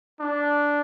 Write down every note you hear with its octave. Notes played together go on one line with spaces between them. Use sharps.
D4